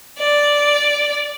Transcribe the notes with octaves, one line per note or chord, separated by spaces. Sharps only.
D5